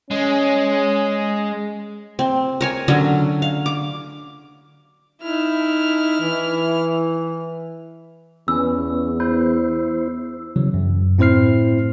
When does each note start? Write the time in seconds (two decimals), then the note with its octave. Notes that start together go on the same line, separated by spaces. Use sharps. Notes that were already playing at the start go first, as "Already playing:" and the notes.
0.11 G#3 C#4
2.19 C4
2.61 A#4 C#5 G#5
2.88 D3 F#3 C#4
3.42 F5
3.66 D6
5.22 D#4 E4 F6
6.20 E3
8.48 E2 B3 C#4 B4 E6
9.20 B3 E4 C5
10.56 C#3 E3 F#3
10.74 F#2
11.18 A2 C4 E4 C5 F6 C7